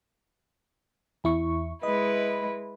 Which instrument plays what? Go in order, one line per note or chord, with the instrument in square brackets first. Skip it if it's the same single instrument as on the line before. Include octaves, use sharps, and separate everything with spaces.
[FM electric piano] E2 E4 C#6
[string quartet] G#3 E4 B4 [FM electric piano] D#5